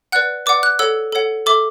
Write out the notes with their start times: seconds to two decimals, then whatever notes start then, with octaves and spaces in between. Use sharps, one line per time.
0.12 B4 D5 F#5 F#6
0.46 B4 D5 F#5 D6
0.63 F#6
0.79 A4 C#5 F#5 E6
1.12 A4 C#5 F#5
1.46 A4 E5 D6